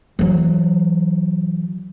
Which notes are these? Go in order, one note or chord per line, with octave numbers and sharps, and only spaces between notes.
E3 F#3